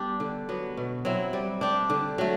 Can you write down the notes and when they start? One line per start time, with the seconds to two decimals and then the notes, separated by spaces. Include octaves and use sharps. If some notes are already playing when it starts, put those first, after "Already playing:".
Already playing: G3 B3 D4 G4
0.20 D3
0.49 F#3 B3
0.77 B2
1.05 F#3 C4 E4
1.33 G3
1.61 D4 G4
1.90 D3
2.18 F#3 A3